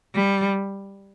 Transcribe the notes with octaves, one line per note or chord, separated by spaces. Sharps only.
G3